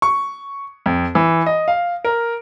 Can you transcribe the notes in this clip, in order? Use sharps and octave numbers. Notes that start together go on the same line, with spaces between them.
C#6
F2
E3
D#5
F5
A#4